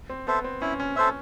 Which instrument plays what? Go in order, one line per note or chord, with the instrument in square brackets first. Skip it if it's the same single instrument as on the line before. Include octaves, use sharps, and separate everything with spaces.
[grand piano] C4
[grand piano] B3 [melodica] A4 C5 E5
[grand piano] C4
[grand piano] C#4 [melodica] E4
[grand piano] C#4
[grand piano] C#4 [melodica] A4 C5 E5